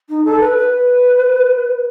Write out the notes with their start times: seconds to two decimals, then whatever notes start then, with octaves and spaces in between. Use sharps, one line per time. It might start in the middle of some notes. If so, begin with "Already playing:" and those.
0.09 D#4
0.25 A4
0.40 B4
0.57 B4